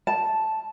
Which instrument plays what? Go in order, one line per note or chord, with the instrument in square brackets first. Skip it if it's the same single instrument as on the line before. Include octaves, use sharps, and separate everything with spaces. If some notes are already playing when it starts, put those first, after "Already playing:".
[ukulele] A5